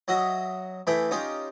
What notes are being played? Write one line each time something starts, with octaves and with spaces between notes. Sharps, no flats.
F#3 F#4 D#5 E5
E3 A3 G#4 E5 G5 B5
C#4 D#4 F4 G4